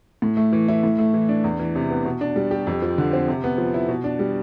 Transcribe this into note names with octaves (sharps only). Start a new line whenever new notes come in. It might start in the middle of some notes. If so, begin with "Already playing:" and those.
A2
A3
E3
E4
A2
A3
E3
D4
E2
E3
C3
B3
B2
D4
G3
G4
F2
F3
D3
C4
C3
B3
F3
E4
B2
D4
G3